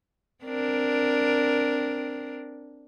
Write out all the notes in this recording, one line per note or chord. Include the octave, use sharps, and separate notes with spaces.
C4 D4 A#4